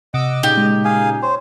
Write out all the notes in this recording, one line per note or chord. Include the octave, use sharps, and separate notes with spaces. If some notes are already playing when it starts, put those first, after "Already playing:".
C3 D#5 F#5 D6 E6
A#2 C#3 D#4 G4
G#3
G#4 F5 G#5
C5 C#5